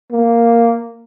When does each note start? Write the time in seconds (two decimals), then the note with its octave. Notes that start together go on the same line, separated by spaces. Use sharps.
0.12 A#3